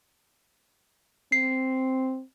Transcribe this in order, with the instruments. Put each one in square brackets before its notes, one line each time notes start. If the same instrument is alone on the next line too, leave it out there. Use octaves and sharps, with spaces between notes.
[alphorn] C4 [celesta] C7